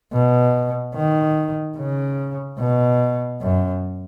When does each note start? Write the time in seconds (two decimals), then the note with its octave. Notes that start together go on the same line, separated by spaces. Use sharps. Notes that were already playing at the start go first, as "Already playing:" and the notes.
0.13 B2
0.95 D#3
1.77 C#3
2.59 B2
3.41 F#2